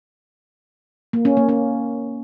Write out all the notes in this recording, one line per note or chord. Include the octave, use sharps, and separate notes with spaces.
A#3
C#4
A#3
C#4